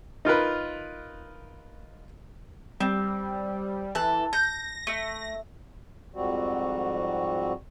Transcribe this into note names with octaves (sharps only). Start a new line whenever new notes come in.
D#4 F4 A#4 B4
G3 C4
E3 A4 F#6
G6 A#6
A3
F2 G#2 G3 C4 F#4